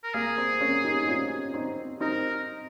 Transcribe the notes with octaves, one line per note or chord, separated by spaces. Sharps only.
A#4
A#3 G#4
C4
A#3 C#4
D#4 G4
D#4
C#4 F4
C4 D#4
C4 D#4 A#4